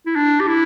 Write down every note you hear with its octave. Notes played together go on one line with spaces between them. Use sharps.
E4
D4
G4
E4